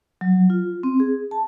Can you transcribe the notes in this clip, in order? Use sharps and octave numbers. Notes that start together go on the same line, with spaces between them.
F#3
F4
C4
G#4
A5